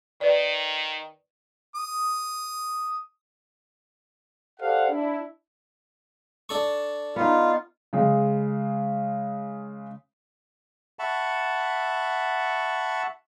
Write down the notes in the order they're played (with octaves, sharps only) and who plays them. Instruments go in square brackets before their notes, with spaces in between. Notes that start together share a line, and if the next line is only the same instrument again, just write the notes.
[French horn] D#3 [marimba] B4 D5
[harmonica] D#6
[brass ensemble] G4 A4 C5 D5 F5 F#5
D4 E4
[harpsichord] D4 A4 C#6
[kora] B3 D#4 [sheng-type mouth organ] F4
[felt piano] C#3 G#3
[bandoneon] E5 F#5 A5 B5 C#6